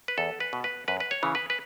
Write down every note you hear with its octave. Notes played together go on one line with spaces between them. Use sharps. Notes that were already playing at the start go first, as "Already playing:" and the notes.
B4
E2 A4
B4
B2
B4
F#2 B4
B4
C#5
C#3 E3
B4
B4